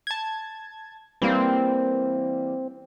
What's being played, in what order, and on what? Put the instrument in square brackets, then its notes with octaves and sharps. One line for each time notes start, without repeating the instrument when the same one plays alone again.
[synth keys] A5 G#6
[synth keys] E3 G3 A#3 [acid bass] C4